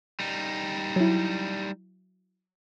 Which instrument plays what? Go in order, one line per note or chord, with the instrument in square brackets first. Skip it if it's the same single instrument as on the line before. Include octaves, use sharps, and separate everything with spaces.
[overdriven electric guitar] G3 D#4
[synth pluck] F#3 E4